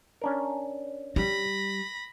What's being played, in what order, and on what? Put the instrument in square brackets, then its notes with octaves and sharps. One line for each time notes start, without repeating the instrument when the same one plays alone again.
[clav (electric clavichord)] C#4 D4 A#4
[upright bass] G3 [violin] B5 A#6